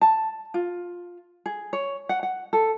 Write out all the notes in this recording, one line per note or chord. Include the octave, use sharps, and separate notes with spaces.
A5
F4
G#4
C#5
F#5
F#5
A4